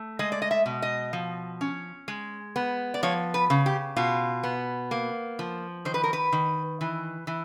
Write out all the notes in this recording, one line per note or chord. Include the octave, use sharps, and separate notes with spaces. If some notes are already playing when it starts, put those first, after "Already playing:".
Already playing: A3
G#3 D#5
D5
D#5
E5
B2
D#5
F3
C#4
G#3
B3
D5
F3 C#5
B4
C#3
G4
B2 F4
B3
A#3
F3
D#3 C5
B4
A#4
B4
D#3
E3
E3